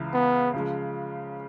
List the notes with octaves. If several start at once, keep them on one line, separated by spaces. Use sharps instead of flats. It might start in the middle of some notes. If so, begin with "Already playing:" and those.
Already playing: C#2 C#3 E3
B3
C#3 F3 G#3